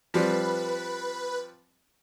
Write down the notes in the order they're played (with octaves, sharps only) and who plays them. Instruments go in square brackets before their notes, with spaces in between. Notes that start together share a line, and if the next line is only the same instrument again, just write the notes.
[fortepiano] F3 G3 C4 [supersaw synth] B4